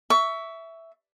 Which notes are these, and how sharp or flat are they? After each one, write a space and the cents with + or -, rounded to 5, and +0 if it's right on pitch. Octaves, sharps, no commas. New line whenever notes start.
E5 +0 C#6 +25